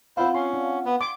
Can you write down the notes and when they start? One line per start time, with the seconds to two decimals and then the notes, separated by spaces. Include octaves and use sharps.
0.17 C4 E4 F4 C5 F5 F#5
0.34 C#4 C6
0.53 D4
0.85 B3
1.01 C6 D6